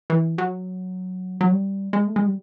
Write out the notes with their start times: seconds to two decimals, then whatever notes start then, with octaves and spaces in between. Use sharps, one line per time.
0.10 E3
0.38 F#3
1.41 F#3
1.51 G3
1.93 G#3
2.07 A3
2.16 G#3
2.26 G3